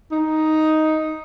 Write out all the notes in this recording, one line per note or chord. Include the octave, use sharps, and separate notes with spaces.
D#4